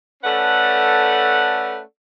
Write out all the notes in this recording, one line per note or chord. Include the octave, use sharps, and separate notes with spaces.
A3 C#4 A4 B4 D5 F#5